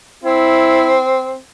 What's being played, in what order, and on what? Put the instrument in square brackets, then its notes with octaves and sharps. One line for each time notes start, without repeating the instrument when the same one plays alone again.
[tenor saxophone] C4 [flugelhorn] E4